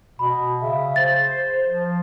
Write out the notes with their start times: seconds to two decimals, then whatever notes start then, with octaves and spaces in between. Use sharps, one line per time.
0.19 B2 B5
0.61 C#3 E5
0.96 C5 A6
1.67 F3